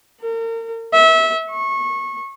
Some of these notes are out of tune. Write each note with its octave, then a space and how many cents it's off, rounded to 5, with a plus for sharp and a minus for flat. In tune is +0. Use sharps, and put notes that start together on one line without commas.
A#4 -35
E5 -25
C#6 -25